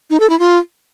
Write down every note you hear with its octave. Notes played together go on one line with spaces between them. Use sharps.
D#4
A4
E4
F4